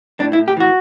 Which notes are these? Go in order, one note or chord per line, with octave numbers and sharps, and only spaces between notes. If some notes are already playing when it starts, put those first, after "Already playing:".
A2 D4
E4
A2
G4
E3 F#4